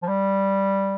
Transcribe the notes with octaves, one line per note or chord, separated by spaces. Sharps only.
F3
G3